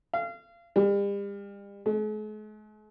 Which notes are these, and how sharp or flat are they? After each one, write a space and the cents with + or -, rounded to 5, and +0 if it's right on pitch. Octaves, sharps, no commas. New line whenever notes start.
F5 -30
G3 +40
G#3 +45